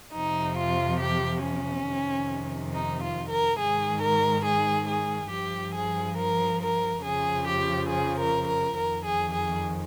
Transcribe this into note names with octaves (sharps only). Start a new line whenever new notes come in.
F2 C3 F3 D#4
F4
G4
C#4
F2 C3 D#3
D#4
F4
A#4
G#2 D#3 G#4
A#4
G#4
G#4
G2 F3 G4
G#4
A#4
A#4
F2 C#3 F3 G#4
G4
G#4
A#4
A#4
F2 D#3 A#4
G#4
G#4